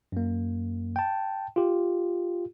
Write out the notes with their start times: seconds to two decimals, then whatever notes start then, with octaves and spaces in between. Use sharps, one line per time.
0.12 F#2 A#3
0.96 G5 A5
1.56 F4 G4